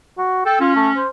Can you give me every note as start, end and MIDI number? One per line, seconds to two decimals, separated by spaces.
0.18 0.44 66
0.46 0.59 69
0.46 0.56 79
0.61 1.04 61
0.61 0.73 65
0.76 0.89 57
0.97 1.08 72